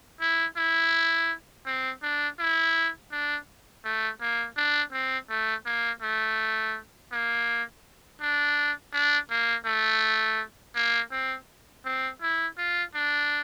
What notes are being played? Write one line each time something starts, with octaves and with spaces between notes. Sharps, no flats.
E4
E4
C4
D4
E4
D4
A3
A#3
D4
C4
A3
A#3
A3
A#3
D4
D4
A#3
A3
A#3
C4
C4
E4
F4
D4